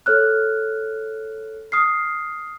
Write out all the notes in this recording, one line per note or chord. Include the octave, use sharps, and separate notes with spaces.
A4 C#5 F6 F#6
D#6 F6 C7